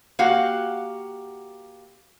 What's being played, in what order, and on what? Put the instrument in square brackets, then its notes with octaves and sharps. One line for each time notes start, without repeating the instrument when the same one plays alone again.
[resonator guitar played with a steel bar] A#3 F#4 G4 F5 F#5